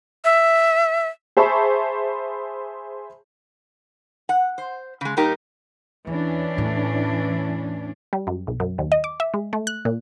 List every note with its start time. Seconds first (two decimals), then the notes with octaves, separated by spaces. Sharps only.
0.24 E5
1.37 G#4 C5 E5 A5 B5 C#6
4.29 F#5
4.58 C5
5.01 C#3 G#3
5.17 A#2 G3 D#4 G4 A#4
6.07 E2 E3 C#4 D4
6.57 E2 A2
8.13 G3
8.27 F#2
8.47 B1
8.60 F#2
8.78 D#2
8.92 D#5
9.04 D6
9.20 E5
9.34 G#3
9.53 A3
9.67 F#6
9.85 A#2